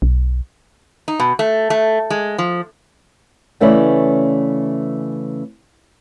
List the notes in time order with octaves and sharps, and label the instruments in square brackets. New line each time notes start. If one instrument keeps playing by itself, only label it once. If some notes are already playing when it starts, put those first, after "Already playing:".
[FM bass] B1
[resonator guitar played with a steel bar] D#4
B2
A3
A3
G#3
F3
[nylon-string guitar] C#3 E3 A3 C#4 B4 D5